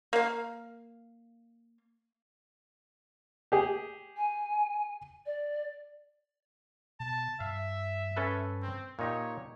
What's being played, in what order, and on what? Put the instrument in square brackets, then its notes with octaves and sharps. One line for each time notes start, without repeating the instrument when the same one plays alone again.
[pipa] A#3 F5
[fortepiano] G4 G#4
[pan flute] G#5
D5
[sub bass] B2 [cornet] A5
[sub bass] G2 [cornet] E5 [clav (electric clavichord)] F5
[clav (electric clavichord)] C#4 A4 B4
[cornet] C4
[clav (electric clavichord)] A#2 D#4 G4 [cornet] C#5